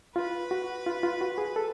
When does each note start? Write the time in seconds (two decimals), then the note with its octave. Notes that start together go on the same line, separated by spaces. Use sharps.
0.16 F4 B4
0.51 F#4
0.86 F4
1.03 F4
1.21 F#4
1.38 G#4
1.56 A4